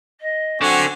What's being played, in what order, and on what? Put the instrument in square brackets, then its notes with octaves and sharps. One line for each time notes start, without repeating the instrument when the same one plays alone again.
[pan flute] D#5
[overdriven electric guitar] D3 [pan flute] F#3 [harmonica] C4 F#4 G#5 [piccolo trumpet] C#6